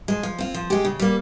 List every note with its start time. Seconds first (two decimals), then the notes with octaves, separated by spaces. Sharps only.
0.08 F3 G#3
0.23 F3
0.39 C4 F4
0.54 F3
0.70 G#3 C#4 G4
0.85 C#3
1.00 G3 A#3